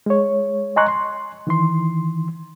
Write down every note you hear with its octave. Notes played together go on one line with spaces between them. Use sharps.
G#3 C#5
D#5 G#5 A#5 C6 C#6 F#6
C6
D#3 E3 C6